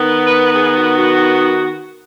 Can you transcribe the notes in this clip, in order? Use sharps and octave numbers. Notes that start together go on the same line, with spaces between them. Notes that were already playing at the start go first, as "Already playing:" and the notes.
Already playing: D#3 B3
B4
G#4
F#4
F#4